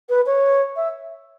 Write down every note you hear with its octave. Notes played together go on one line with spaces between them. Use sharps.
B4
C#5
E5